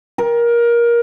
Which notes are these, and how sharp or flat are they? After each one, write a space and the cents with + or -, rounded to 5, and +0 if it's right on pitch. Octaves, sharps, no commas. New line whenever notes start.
A#4 +20